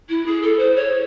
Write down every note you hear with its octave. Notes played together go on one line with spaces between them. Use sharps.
E4
G#4
A4
C5
C#5